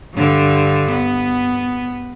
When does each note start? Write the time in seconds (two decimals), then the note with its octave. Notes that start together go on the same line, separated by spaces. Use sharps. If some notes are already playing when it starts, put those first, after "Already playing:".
0.15 G2 D3
0.92 B3